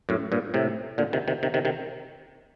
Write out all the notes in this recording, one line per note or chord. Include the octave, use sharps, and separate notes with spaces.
F#2 A2
G2 A#2
A2 C3
A#2 D3
C3 D#3
C3 D#3
C3 D#3
C3 D#3
C3 D#3